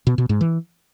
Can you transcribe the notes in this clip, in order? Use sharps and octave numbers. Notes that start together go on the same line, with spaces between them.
B2
B2
G#2
E3